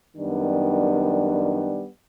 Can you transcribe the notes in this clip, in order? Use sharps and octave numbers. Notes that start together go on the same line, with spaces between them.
F#2 D#3 G3 B3 D4